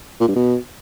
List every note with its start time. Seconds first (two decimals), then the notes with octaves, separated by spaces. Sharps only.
0.20 A#2
0.28 G2
0.36 B2